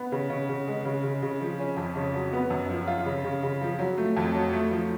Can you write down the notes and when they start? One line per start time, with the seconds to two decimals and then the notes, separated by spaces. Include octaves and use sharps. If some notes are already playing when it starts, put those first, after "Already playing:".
Already playing: B3
0.12 C#3
0.30 C#3
0.49 C#3
0.67 G#3
0.85 C#3
1.03 C#3
1.23 C#3
1.41 F3
1.60 C#4
1.77 F2
1.96 C#3
2.14 F#3
2.33 B3
2.50 F#2
2.69 F3
2.87 F4
3.06 C#3
3.24 C#3
3.43 C#3
3.61 F3
3.79 F#3
3.98 A3
4.17 F2
4.35 F#3
4.53 A3
4.71 F3